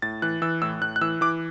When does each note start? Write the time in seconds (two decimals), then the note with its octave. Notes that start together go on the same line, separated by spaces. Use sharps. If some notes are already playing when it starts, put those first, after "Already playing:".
0.02 A2 A6
0.22 E3 F#6
0.42 E3 E6
0.62 A2 E6
0.81 A2 F#6
0.96 F#6
1.01 E3 E6
1.21 E3 D6